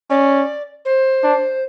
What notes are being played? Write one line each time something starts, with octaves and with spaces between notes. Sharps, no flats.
C#4 D5
C5
D4